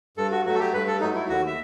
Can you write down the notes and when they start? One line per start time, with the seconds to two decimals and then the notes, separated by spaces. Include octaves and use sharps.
0.17 G2 A4
0.32 F#4
0.45 F#3 A3 F#4
0.54 A4
0.60 G4
0.73 G2 B4
0.87 A4
1.01 F#3 A3 D#4
1.15 E4
1.29 D#2 F#4
1.47 E5